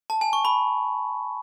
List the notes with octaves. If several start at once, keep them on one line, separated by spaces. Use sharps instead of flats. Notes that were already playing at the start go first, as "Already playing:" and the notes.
A5
G#5
C#6
B5